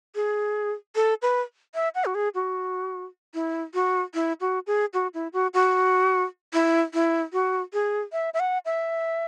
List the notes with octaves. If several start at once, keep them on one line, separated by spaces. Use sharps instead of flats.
G#4
A4
B4
E5
F#5
F#4
G#4
F#4
E4
F#4
E4
F#4
G#4
F#4
E4
F#4
F#4
E4
E4
F#4
G#4
E5
E5
F#5
E5